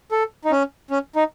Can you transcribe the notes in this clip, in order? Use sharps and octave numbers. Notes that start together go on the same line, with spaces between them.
A4
D#4
C#4
C#4
D#4